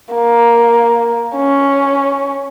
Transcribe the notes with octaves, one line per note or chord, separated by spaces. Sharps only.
A#3
C#4